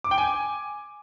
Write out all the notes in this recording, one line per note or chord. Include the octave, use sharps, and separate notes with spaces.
D6
G5
G#5